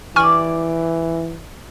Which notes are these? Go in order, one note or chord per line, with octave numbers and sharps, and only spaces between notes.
E3 E4 G4 D5 G#5 C#6 F6